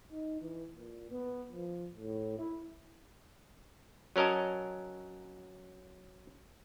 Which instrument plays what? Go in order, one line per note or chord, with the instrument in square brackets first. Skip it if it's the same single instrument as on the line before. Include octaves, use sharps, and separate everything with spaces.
[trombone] D#4
E3
A#2
B3
F3
A2
E4
[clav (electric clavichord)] F#3 C#4 A#4 D#5 A5